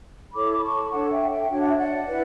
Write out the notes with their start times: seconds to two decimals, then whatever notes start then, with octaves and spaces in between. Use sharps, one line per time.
0.33 E4 A4 C#5 B5 D6
0.51 D6
0.62 A5 C#6
0.91 D4 A4 C#5 F#5 A5
1.10 E5 G5
1.30 E5 G5
1.49 D4 F#4 C#5 G5
1.59 F#5
1.67 E5
1.77 D5 F#5
2.07 E4 B4